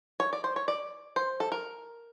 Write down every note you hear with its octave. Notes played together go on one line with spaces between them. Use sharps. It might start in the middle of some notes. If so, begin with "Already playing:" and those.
C#5
D5
C5
C#5
D5
C5
A4
A#4